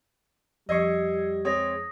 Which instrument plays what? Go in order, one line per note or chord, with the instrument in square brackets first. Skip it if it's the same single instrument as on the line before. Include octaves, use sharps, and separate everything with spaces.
[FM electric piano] F2 G#6 [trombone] G3 [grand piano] D#5 C#6 [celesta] E6 C7 C#7
[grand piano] G#3 C4 C#5 [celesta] D#6 A#6